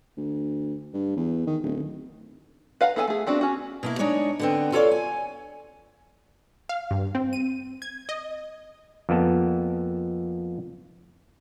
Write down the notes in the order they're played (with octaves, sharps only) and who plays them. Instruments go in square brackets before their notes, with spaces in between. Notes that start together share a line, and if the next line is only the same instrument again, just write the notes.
[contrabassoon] D2
G2
E2
D#3
D1
[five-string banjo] B4 F5 F#5 A#5
B3 G#4 A4 G5 G#5
A3 G#4
B3 C4 D4 F#4
C#4 F#4
[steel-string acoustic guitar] B2 A#3 E4
G#3 D4 D#4 C#5
D3 B3 C4
F4 A4 A#4 C#5 D5 F5
G#5
[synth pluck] F5
G2
C4
D#7
G#6
D#5
[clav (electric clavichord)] F2 A#3 B3 A5